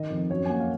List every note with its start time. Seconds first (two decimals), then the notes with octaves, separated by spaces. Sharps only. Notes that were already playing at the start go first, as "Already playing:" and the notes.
Already playing: D#3 D#5
0.10 F2
0.30 F#2 C#5
0.46 G#5
0.50 A#3 F#5
0.60 F5